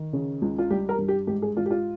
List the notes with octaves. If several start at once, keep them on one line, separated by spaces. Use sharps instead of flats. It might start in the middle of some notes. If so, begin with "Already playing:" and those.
Already playing: D#3
C#3
C#2
F4
G3 G4
A#4
G2
G4
G#2 G4
G#4
G#2 F4
G4
F4